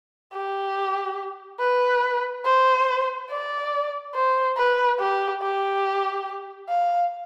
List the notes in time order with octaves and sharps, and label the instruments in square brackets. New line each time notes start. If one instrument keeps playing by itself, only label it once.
[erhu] G4
B4
C5
D5
C5
B4
G4
G4
F5